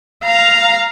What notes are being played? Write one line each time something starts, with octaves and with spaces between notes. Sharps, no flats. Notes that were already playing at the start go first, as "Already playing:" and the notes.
F5 A#5